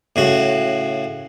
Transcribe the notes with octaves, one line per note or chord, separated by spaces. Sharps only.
A2 C#3 F#4